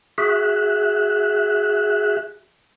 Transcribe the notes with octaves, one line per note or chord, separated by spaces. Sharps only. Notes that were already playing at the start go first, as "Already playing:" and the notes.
F#4 G#4 E5 F#6